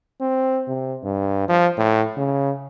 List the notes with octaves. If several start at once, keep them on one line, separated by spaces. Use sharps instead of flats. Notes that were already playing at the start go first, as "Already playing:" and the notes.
C4
C3
G2
F3
A2
C#3